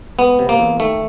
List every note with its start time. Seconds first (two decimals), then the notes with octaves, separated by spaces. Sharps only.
0.19 G#3 B3
0.39 C3
0.49 A#3
0.59 E2
0.80 D#3 A3